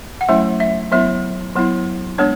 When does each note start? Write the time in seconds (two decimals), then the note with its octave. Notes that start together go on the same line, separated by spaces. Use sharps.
0.21 F#5
0.29 F#3 A3 C#4 E4 E5
0.60 E5
0.92 F#3 B3 E4 E5
1.55 F#3 B3 E4
2.18 G#3 B3 D4 C#5